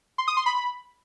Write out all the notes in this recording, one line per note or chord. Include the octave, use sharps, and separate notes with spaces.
C6
D#6
C6
B5